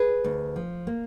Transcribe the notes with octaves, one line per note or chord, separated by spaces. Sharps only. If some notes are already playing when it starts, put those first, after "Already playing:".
Already playing: G#4 B4
D2
F3
A#3